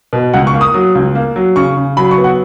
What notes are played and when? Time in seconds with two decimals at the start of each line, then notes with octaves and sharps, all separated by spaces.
0.13 B2
0.33 C#2 F#5
0.47 C#6
0.54 A#3
0.61 D#6
0.74 F#3
0.95 C#2
1.15 A#3
1.36 F#3
1.56 C#3 C#6
1.77 C#3
1.97 F#3 B5
2.11 C#6
2.18 B3
2.24 F#5